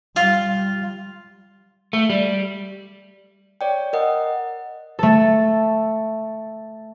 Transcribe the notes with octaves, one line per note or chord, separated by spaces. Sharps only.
G3 F4
A3
G3
C#5 D5 G5
A#4 D#5 F#5
A3 A4